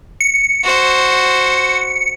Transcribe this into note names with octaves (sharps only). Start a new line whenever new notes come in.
C#7
F#4 C5